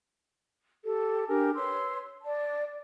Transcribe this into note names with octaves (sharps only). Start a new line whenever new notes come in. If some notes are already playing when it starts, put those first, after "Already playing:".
G4 A4
D4 G4 A#4 G#5
B4 C#5 C6 E6
D5 A5